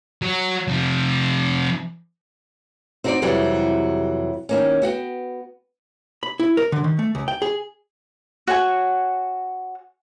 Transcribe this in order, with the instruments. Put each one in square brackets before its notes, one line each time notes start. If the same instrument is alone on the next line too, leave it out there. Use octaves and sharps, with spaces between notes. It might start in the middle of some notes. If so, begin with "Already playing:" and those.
[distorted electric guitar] F#3 F#4
C3 F3
[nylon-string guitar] C4 D#4 F#4 A#4 C5 D5
F2 C3 E3 F#3 G3
D#3 A#3 C#4
B3 F#4 F#5 G5
[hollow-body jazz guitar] B5
E4
A#4
D3
D#3
A3
C#2
G5
G#4
[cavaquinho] F#4 C#5 F#5 G#5